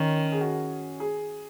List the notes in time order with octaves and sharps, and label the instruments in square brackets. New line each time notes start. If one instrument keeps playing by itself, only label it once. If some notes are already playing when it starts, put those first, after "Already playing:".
Already playing: [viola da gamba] D#3 [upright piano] C#4
[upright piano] G#4
F#4
G#4